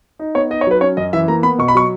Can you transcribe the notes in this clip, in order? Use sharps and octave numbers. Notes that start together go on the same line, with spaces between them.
D#4
B3 C#5
D#4 D#5
C#5
F#3 B4
C#4 C#5
F#2 D#5
E3 E5
A#3 A#5
B3 B5
B2 C#6
B5
F#3 C#6